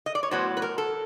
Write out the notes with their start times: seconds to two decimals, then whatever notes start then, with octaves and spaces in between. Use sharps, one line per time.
0.06 D#5
0.15 D5
0.23 C#5
0.31 A2 F#3 B3 C5
0.57 B4
0.62 A#4
0.78 A4